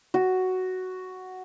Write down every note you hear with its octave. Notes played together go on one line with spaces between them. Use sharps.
F#4